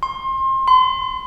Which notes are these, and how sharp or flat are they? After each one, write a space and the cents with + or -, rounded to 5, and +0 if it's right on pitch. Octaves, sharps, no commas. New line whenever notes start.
C6 +30
C6 -40